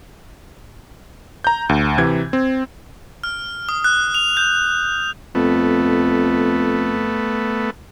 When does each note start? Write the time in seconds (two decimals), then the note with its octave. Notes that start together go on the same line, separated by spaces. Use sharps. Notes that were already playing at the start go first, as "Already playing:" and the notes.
1.44 A#5 G6
1.69 D2
1.98 C3 E3 G#6
2.33 C4
3.24 F6
3.69 D#6
3.84 F#6
4.14 F7
4.37 G6
5.35 F2 A3 B3